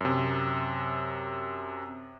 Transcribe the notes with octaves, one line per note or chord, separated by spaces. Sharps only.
F#2 C3